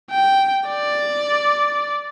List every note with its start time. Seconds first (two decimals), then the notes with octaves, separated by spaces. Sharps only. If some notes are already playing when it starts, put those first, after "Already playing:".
0.11 G5
0.69 D5